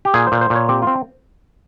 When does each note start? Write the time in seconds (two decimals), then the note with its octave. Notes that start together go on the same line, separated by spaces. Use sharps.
0.05 G4
0.14 A#2 G#4
0.27 A#2 C5
0.41 C5
0.50 A#2
0.56 C#5
0.69 C4 G4
0.82 C4 F4